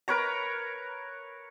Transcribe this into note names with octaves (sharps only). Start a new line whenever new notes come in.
A#4 B4 C#5 A#5